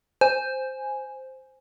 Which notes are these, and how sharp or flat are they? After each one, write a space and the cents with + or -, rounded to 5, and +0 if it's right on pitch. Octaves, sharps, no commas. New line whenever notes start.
C5 +0 G#5 +0